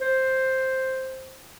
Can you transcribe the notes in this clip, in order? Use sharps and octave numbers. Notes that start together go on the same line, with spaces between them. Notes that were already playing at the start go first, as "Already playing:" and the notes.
C5